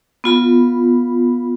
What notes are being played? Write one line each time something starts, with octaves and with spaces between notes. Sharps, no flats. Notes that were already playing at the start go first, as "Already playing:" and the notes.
B3 F4 B5